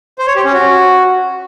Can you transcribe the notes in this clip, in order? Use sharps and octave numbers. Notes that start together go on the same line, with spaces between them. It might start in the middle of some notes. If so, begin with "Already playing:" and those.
C5
C#5
G4
C#4
F#4